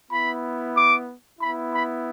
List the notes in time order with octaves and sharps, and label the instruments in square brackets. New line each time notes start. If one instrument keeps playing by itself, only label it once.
[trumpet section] B3 E4 B5
D6
B3 E4 B5
B5